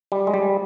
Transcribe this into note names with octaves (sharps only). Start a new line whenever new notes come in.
G3
G#3
G3